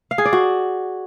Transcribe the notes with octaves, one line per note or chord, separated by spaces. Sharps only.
F5
G#4
D5
F#4